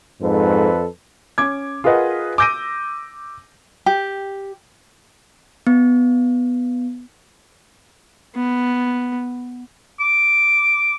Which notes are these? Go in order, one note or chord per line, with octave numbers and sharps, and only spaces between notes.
F2 G#2 A4 B4
C#4 D6 G#6
F4 G#4 A#4 B4 D#5 F#5
D6 E6 G6 A#6 D7 D#7
G4
B3
B3
D6